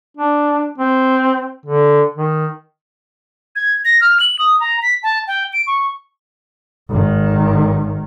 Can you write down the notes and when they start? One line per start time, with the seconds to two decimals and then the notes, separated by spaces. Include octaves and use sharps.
0.17 D4
0.78 C4
1.66 D3
2.15 D#3
3.56 G#6
3.85 A#6
4.01 F6
4.20 F#7
4.39 D#6
4.60 A#5
4.82 B6
5.03 A5
5.27 G5
5.53 D7
5.67 C#6
6.90 G#1 D#3